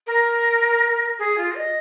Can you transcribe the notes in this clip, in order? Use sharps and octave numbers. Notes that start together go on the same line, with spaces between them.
A#4
G#4
F4
D#5